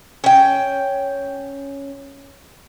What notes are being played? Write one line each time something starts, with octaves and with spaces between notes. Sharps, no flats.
C#4 G5